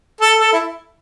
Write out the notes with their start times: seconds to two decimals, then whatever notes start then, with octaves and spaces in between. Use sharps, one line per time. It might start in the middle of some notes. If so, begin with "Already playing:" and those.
0.21 A4
0.39 A4
0.53 E4